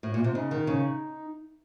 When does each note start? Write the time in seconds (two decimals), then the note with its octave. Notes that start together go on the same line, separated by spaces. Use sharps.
0.03 A2
0.14 A#2
0.24 C3
0.35 C#3 D#4
0.51 D#3
0.67 C#3